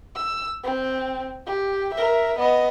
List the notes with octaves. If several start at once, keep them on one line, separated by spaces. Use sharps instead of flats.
E6
C4
G4
A#4 E5
B3 D#5